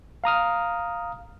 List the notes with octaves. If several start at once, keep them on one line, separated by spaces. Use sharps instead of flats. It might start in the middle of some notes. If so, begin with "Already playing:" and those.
F5 A#5 D#6 F6